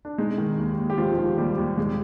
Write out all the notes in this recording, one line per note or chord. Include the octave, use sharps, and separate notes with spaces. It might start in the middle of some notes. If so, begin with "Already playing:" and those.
D4
G#3 D#4
D#3
D#2
D#2
G4
F3 G#3 F4
D#3
D#2 G3 G4
D#2
G3 G#3 G#4